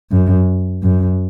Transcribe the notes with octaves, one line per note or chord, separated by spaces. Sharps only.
F#2
F#2